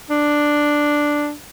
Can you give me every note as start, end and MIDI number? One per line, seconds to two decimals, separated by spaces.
0.10 1.32 62